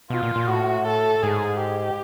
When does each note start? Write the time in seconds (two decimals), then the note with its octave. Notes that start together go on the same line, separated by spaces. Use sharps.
0.10 B2 F4
0.23 A#2
0.36 A#2
0.47 A2 F#4
0.86 A4
1.22 G#2 G#4
1.60 G4